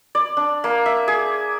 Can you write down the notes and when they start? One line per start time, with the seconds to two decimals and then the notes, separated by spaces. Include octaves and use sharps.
0.15 D5
0.37 D4
0.64 A#3
0.86 E5
1.08 G#4